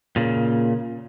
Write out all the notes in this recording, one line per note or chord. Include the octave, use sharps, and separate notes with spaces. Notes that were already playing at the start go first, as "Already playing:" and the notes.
A#2 C#3